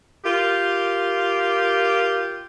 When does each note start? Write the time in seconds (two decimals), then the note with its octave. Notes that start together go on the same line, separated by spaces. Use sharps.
0.25 F4 G4 A#4